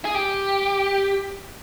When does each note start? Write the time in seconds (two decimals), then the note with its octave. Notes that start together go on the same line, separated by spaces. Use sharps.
0.05 G#4
0.15 G4